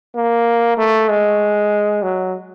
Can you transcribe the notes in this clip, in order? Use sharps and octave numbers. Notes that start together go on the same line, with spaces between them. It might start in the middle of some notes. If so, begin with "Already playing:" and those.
A#3
A3
G#3
F#3